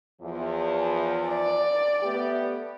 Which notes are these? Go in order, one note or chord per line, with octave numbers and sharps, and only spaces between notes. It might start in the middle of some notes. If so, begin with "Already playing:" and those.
E2 F3
D5
A3 B3 G4